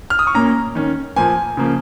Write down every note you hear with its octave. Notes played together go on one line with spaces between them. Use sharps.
F6
D#6
C#6
A#2 A#3 C#4 A#5
D#3 C#4
A#2 F3 A#3 G#5
C#3 F3 A#3